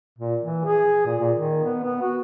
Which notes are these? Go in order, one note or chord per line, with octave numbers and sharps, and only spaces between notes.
A#2
E3
G#4
A#2
A#2
D#3
B3
B3
F#4